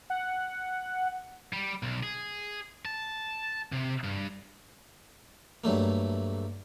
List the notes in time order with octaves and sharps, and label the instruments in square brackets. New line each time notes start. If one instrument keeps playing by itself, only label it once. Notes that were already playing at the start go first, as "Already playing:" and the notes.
[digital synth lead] F#5
[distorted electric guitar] G3
B1
G#4
A5
C3
G2
[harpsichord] G2 F#3 A3 A#3